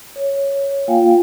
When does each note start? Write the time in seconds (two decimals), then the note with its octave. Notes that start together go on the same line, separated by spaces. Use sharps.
0.16 C#5
0.88 A#3 F4 F5 G5 G#5